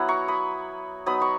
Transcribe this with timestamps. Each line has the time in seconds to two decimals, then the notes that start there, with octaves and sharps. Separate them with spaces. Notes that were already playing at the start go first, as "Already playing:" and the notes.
Already playing: F#3 B3 E4 F#5
0.08 A#5 C#6
0.28 B5 D#6
1.06 F#3 B3 D#4 B5 D#6
1.22 A#5 C#6